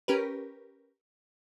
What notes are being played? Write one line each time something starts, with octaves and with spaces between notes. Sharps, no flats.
C#4 G4 A#4 B4